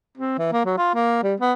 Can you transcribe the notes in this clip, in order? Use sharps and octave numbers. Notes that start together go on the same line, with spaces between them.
C4
E3
A#3
F#3
F4
A#3
G3
B3